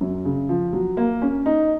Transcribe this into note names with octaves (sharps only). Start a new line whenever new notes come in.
F#2
C#3
F3
F#3
A#3
C#4
D#4